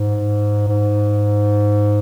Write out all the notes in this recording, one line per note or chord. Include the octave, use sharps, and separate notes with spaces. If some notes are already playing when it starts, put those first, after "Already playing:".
Already playing: G#2
G#2